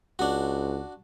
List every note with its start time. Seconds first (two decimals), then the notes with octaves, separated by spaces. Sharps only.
0.19 C#2 D4 F#4